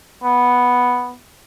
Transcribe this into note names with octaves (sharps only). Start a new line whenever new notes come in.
B3